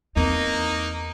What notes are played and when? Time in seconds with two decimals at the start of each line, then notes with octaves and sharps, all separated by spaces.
0.16 E2 A#3 C4 D#4